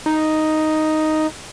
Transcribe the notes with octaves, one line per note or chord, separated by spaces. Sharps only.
D#4